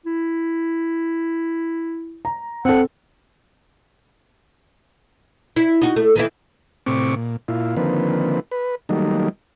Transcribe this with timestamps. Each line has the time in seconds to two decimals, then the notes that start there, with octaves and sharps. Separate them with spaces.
0.06 E4
2.25 A#5
2.65 C4 A4 F#5
5.56 E4
5.82 D#4 F#4
5.96 A3
6.16 D#3 E3 E4
6.86 A2 C3 C4 C#6 D6
7.16 A#2
7.48 A#2 E4 F4
7.77 D3 D#3 F3 A#3 C4 B4
8.51 B4
8.89 D#3 F#3 G3 A3 A#3 D#4